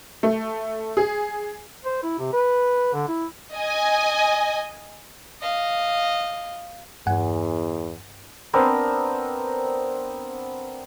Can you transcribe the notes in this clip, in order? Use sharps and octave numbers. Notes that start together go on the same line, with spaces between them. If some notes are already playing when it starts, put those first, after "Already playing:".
A3
G#4
C5
E4
C3
B4
D3
E4
D#5 G#5
D#5 F5
E2 G2 F#5 G#5
B3 C4 D4 A#4